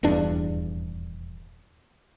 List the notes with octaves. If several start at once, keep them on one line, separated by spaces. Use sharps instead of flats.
D#1 E2 G2 D4